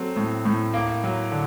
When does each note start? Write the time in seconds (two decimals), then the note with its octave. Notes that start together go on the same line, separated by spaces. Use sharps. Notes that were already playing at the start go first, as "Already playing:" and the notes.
Already playing: F#3 A3 C4
0.16 A2
0.45 A2
0.74 A#3
1.04 F#3
1.32 D3